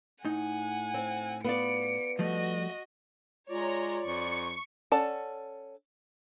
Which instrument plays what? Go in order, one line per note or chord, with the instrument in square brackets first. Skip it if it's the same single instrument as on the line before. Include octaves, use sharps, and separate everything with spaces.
[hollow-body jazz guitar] A2 D#4 [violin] F#5 G#5
[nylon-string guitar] C4
[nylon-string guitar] B3 F4 D5 [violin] C#7 D7
[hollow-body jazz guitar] F3 G3 A3 [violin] F#4 D#5
[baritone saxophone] G#3 [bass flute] F4 [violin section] C#5 A#5 [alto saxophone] D5
[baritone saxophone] F2 [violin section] C#6
[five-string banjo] C#4 A4 D5 F#5 A5